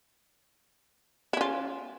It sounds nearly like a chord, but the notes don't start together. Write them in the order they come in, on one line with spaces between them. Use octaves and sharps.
E4 C#4 F4